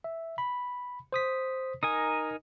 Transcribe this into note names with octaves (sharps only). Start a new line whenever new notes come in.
E5
B5
C5 D#6 B6
D#4 A#4 G#5 D#6